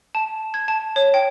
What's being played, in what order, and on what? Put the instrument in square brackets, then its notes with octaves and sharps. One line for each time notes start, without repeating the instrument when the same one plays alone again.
[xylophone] A5
G#6
A5
C#5
G5